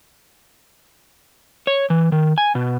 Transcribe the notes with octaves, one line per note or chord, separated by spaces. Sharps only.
C#5
E3
D#3
G#5
B2